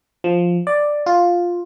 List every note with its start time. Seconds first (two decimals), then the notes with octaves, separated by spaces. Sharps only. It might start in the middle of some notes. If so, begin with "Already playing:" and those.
0.24 F3
0.67 D5
1.06 F4